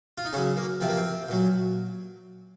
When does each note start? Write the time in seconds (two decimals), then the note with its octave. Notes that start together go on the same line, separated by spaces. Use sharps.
0.18 F4
0.25 D#4
0.33 C#3 F#3 C#4
0.57 A#3
0.80 C3 F3 C4
0.88 A#3
0.97 C4
1.29 A#2 F#3